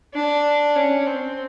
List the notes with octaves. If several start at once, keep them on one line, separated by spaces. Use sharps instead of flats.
D4
C#4
C4